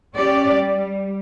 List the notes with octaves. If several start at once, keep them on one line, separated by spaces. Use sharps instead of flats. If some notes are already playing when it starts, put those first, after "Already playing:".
C#4 G4 D5
G3